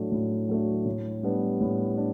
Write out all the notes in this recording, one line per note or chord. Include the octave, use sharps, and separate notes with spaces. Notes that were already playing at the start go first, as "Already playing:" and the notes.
Already playing: A2 F#3 A3 D4
A2
F#3 A3 D4
A2
G3 B3 D4
A2
D4